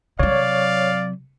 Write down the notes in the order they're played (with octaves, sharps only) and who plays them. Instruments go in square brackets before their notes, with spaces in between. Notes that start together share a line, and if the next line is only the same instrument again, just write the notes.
[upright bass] C3 F#3 [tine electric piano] C#5 [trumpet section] D5 F5